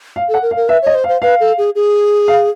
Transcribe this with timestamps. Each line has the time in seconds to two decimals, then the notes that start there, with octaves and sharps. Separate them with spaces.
0.16 F5
0.29 A4
0.34 F#5
0.42 A#4
0.51 F5
0.56 A#4
0.68 B4 E5
0.82 C#5 D#5
0.95 C5
1.04 F5
1.08 C5
1.22 B4 F5
1.40 A4
1.58 G#4
1.75 G#4
2.28 F5